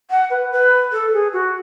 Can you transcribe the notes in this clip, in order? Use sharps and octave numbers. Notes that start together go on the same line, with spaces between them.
F#5
B4
B4
A4
G#4
F#4